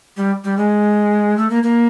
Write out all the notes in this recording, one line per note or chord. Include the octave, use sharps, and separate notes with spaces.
G3
G3
G#3
A3
A#3
A#3